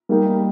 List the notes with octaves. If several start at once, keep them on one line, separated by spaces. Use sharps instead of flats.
G3 A#3 D#4 G4 A#4